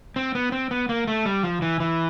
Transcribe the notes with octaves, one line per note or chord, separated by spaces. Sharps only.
C4
B3
C4
B3
A#3
A3
G3
F3
E3
E3